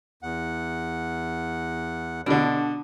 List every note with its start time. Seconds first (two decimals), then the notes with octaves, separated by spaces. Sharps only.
0.23 E2 F#5
2.26 B2 D3 D4